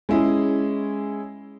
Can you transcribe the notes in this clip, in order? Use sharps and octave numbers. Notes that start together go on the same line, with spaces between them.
G#3 C#4 E4 G#4